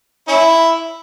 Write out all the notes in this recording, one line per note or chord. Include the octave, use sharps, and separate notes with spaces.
C#4 E4